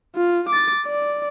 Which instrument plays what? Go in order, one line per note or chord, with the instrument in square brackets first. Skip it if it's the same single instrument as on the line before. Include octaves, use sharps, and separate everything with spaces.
[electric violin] F4
D6 A6
D5